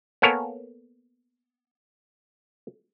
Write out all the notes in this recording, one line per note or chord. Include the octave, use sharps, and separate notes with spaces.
A#3 B3 A4 A#4 C#5 G#5